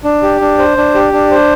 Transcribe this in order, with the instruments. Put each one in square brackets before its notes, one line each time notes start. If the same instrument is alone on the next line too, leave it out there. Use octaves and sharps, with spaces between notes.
[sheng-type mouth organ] D4
G4
D4
C5
D4
G4
D4
C5